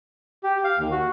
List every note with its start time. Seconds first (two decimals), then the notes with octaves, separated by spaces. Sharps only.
0.43 G4
0.64 F5
0.78 D#2
0.91 F#4